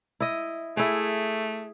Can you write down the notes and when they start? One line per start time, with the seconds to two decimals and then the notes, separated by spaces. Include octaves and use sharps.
0.20 E4 D#5
0.77 A3 E4 G#4